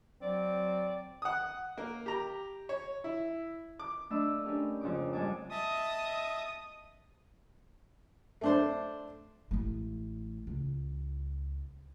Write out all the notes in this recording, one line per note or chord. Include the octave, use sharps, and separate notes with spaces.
F#3 C4 D5
F#5 D#6
A#3 A#4
G4 A#5
C#5
E4
D6
A3 D4 D#5 B5 D6 E6
C#4 D4 G4 A#4
F2 G#2 C#3 D#4 D6
G#2 G3 G#5 A5 D6
D#5 E5 A5 D#6
A3 D4 C5
A1 A3
C#2